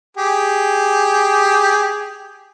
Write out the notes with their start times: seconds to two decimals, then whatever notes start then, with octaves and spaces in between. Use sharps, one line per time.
0.17 G4 G#4